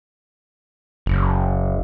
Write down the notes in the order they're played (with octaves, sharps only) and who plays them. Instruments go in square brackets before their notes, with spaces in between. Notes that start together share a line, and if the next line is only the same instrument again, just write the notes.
[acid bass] F#1